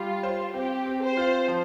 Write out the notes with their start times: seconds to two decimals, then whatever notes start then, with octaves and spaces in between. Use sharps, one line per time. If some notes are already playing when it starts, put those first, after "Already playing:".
Already playing: G3 F4
0.23 C5
0.54 C4 G4
0.86 C4
1.01 C5
1.17 F4
1.48 F3